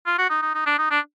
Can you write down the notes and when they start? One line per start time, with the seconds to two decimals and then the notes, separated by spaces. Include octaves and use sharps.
0.06 F4
0.18 F#4
0.30 D#4
0.42 D#4
0.55 D#4
0.66 D4
0.78 D#4
0.91 D4